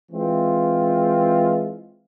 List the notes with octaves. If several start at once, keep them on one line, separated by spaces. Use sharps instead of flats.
E3 G#3 C4 F4